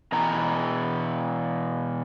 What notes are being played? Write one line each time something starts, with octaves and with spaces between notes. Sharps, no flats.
B2 E3 A#5